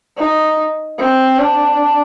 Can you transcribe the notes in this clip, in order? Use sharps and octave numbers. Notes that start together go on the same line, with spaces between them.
D#4
C4
D4